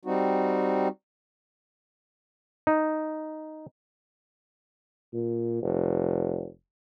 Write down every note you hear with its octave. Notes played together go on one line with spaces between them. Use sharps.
G3 C4 D#4 F#4
D#4
A#2
F1